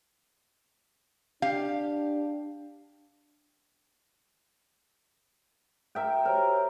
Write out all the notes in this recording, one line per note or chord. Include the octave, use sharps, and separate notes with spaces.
D4 G4 F5
A#4 E5 G5
G4 A#4 C5 C#5